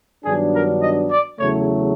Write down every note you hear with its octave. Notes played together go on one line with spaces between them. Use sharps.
G2 D#3 F#3 B3 D4 G#4
A#4
D#5
D5
E2 C#3 F#3 A3 C#5